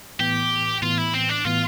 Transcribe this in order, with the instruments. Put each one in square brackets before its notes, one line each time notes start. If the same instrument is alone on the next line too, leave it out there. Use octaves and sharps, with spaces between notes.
[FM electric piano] A2 E3 B3 [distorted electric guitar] G4
[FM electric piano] A2 E3 B3 [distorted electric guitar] F4
[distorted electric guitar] E4
C4
D4
[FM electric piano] A2 E3 B3 [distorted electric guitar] F4